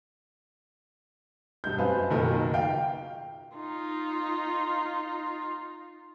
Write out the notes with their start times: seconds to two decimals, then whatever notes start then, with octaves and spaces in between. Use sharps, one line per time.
1.64 E1 G2 D#4 G6
1.78 F#2 C4 B4 F5 G#5 A5
2.10 F#1 B1 D#3 F3 F#3 A#3
2.54 F5 G5
3.57 D#4 F4